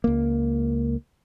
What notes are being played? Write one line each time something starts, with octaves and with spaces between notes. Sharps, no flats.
C#2 A#3